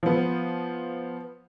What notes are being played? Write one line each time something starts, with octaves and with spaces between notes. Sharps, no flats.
F3 B3